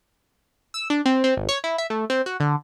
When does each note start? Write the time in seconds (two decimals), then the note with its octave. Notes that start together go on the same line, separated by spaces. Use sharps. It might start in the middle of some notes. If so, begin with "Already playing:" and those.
0.74 E6
0.90 D4
1.06 C4
1.24 C4
1.37 G#1
1.49 C#5
1.64 E4
1.78 E5
1.90 A3
2.10 C4
2.26 F#4
2.40 D3